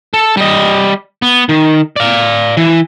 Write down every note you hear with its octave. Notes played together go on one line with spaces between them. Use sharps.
A4
G3 D#5
B3
D#3
D5 F5
E3